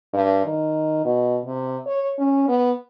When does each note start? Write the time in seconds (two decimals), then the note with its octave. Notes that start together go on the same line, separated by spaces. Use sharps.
0.13 G2
0.45 D#3
1.05 B2
1.46 C3
1.87 C#5
2.19 C#4
2.48 B3